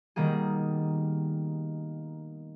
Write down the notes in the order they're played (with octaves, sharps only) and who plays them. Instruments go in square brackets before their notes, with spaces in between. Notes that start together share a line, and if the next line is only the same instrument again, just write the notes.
[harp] B2 D#3 G3 A#3 G#4